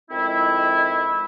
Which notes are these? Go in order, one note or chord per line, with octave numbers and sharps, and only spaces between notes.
F2 D#3 G#3 C4 E4